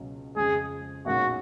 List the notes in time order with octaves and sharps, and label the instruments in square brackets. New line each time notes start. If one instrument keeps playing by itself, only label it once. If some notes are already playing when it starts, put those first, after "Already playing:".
Already playing: [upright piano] C#2 B2 F#3 C#4
[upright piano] F2 C#3 G#3 [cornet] G#4
[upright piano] B1 A#2 G#3 C#4 [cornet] F#4